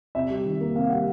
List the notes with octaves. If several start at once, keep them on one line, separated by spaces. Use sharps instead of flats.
C3 E5
G3
D#3
A#3
C3 F5
G3 F#5